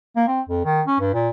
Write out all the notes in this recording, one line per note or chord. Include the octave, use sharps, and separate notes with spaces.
A#3
C4
F2
D#3
C#4
G2
A#2